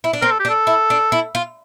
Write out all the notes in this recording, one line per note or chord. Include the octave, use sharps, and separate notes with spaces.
E4
D4
C4 A#4
A4
G4
D4
A4
E4
D4
E4
F4